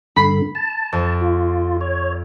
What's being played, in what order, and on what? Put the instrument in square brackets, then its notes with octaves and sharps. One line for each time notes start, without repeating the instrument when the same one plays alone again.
[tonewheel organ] G2 D3 [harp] B5 B6 C7
[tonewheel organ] A5
[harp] F2
[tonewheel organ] F4
C#5